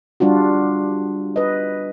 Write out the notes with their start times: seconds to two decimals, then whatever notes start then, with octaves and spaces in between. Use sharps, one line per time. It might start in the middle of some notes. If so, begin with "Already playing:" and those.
0.20 G3 D4 F4 F#4
1.36 B4 D#5